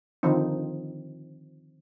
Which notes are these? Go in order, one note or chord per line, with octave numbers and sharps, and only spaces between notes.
D3 D#3 F3 C4 D#4